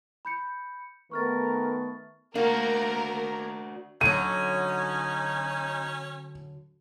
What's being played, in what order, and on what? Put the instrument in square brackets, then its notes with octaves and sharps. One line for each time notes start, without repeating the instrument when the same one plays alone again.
[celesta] B5 G6 C#7
[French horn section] D#3 A3 B3 [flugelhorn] A#4 [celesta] C#6 F6 A6
[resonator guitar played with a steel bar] A#3 [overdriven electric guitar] D4 F#4 [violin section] A#4
[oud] D3 F#3 [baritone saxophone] C#4 [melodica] D#4 G#5 [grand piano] D#7